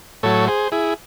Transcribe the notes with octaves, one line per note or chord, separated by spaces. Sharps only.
A2 F#3 A4 C#5
G#4 C5
E4 G#4